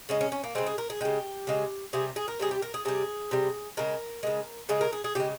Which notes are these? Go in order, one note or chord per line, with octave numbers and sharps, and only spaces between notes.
C#3 G#3 C#4
C#4
C#4
A#3
C#3 G#3 C4
G#4
A#4
G#4
C#3 G#3 G4
C#3 G#3
C3 G3 G#4
G#4
A#4
C3 G3 G#4
G4
A#4
G#4
C3 G3 G#4
C3 G3
C#3 G#3 A#4
C#3 G#3
C#3 G#3 G#4
A#4
G#4
G#4
C#3 G#3 G4